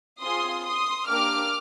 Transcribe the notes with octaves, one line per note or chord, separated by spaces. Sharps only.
C4 F4 G#4 C6 D#6
C6 D#6
A#3 D4 G4 D6 F6